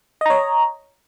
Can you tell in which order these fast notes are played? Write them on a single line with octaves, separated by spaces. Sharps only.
D#5 A#5 C#5